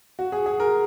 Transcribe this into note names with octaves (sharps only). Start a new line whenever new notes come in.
F#4
G#4
G#4
A#4